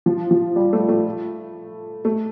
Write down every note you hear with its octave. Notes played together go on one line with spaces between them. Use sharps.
F3
F3
G3
A3
A3
A3